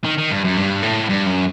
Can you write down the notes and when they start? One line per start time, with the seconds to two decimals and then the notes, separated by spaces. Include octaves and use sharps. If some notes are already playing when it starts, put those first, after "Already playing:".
0.05 D#3
0.18 D#3
0.31 G2
0.44 F#2
0.57 G2
0.83 A2
1.09 G2
1.27 F#2